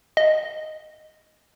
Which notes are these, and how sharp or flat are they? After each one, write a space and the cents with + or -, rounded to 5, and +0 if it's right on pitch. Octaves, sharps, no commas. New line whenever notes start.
D#5 -10